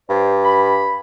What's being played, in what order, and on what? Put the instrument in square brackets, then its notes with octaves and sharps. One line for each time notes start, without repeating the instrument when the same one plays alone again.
[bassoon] G2 [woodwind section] C5 D5
[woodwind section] B5